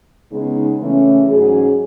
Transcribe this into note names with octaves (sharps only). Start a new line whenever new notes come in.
C#3 G#3 B3 D#4
C#3 E3 A3 C#4 E4
G#2 F#3 C#4 G#4